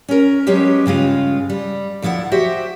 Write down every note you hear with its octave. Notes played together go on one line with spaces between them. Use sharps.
C#4 A#4
F#3 G#3 B3 C#4 G4
G2 C#3 G#3 F4
G3
D2 F3 E4 A#4 F#5
F#4 G4 C5 E5